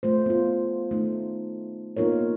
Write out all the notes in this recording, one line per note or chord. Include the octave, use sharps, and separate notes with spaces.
A3 F4 C5
B3 F4
A3 D#4
A#3 B3 D#4 F4 A#4 C#5